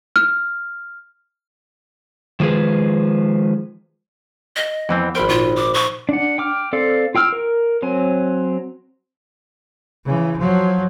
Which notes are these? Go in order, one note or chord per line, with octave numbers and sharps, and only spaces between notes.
F6
D#3 F3 G#3 G#4 B4
D#5
F2 E3 F3 B3 C4
G#1 A#4 C5 G5 B5
A#2 D#4 F4
D6
C#6
D4 F#5
G5 D6 F6
C4 A4 D5 F5
F4 G5 E6 F6
A#4
F#3 C4 G#5
C#3 E3
F3 F#3